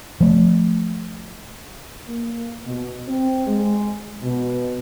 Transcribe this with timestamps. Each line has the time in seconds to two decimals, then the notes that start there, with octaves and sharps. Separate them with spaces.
0.21 F3 A3
2.09 A#3
2.65 B2
3.08 C4
3.47 G#3
4.23 B2